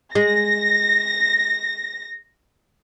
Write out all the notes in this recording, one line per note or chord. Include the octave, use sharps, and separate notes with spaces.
G#3 A#6